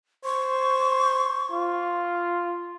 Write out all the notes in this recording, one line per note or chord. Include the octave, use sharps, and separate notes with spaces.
C5 C#6
F4